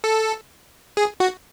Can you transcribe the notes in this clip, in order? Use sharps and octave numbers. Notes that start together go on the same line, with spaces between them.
A4
G#4
F#4